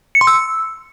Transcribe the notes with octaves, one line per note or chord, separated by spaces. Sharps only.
C#7
C6
E6